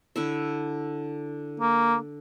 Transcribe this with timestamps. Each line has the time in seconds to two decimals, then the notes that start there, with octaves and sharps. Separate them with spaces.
0.16 D3 E4 E5
1.60 A#3